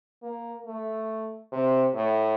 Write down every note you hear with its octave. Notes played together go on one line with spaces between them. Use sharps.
A#3
A3
C3
A2